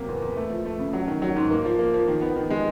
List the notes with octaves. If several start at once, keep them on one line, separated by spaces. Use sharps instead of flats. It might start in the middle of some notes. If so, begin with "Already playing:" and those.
Already playing: C3 F#3 A#3
E2
E2
A3
F3
A3
C#3
F#3
D#3
F#3
G#2
A#3
F3
A#3
F3
D#3
B3
D#3
G#3